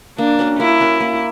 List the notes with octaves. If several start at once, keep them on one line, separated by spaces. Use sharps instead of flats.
A#3 D4
C#4 F#4 A#4
A#3 E4
C#4 F#4 A#4
A#3